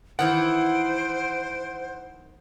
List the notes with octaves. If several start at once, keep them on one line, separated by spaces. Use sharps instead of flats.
D#3 E3 E4 C5 F#5 D7